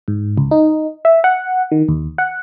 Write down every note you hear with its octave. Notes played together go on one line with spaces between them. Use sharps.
G#2
C#2
D#4
E5
F#5
D#3
D#2
F#5